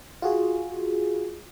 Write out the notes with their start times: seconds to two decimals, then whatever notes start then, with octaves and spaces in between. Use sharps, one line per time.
0.22 F4 F#4 G#4